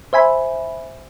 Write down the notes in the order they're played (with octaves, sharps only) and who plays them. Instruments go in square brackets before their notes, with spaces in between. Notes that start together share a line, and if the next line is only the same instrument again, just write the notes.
[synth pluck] C5 E5 G#5 B5